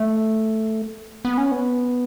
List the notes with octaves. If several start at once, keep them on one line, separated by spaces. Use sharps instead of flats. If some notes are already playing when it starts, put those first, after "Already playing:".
Already playing: A3
B3
C#4
B3